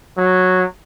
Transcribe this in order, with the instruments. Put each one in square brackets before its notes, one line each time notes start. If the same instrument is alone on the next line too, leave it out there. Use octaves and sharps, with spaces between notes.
[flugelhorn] F#3